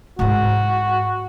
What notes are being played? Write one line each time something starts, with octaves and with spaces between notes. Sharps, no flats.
G#2 E4 F#4